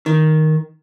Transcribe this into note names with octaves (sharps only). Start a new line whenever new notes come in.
D#3